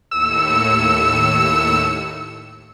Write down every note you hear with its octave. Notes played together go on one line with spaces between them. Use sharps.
D#2 A2 E6 C#7